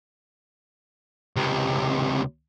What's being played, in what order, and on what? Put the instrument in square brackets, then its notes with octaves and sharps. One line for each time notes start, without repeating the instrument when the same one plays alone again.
[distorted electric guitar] C#2 C3